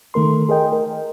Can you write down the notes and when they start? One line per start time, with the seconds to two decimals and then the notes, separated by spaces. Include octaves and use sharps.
0.14 D#3 A3 A#4 C6
0.49 G#4 A#4 D#5 G5
0.72 A#4